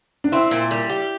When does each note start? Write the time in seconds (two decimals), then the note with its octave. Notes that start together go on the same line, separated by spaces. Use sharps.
0.24 D4
0.32 C4 E4
0.51 A#2
0.71 G3
0.90 G4